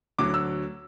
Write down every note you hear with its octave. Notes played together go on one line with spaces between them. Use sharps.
D2 D3 F#3 D6
E6